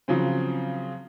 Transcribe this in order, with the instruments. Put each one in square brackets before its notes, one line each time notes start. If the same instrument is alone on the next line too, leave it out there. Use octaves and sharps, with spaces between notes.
[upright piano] C#3 F3 F#3 C4